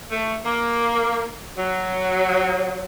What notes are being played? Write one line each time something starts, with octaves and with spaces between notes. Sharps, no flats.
A3
A#3
F#3